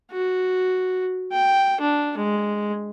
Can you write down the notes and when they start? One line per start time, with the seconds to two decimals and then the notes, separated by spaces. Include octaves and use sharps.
0.12 F#4
1.32 G5
1.81 D4
2.17 G#3